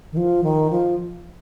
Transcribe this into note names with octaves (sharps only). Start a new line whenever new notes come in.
D#3
F3
D#3
F3